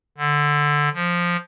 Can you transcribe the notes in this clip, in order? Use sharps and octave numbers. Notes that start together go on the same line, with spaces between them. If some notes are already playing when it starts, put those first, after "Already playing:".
D3
F3